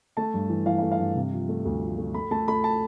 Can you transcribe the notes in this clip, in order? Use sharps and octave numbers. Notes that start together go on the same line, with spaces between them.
A3 A5
G2
E3
E3 F5
F5
A3
F5
G2
C3
F3
A3
D2
F3
A3
A3 B5
A3 A5
A3 B5
A5